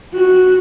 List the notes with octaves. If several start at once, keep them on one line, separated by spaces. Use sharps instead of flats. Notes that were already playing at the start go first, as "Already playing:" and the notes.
F#4